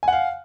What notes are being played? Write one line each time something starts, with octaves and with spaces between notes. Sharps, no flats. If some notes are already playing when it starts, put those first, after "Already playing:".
F5 F#5 G#5